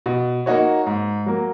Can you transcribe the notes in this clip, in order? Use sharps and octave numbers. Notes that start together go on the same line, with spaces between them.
B2
A#3 D#4 F#4 C#5
G#2
F#3 A#3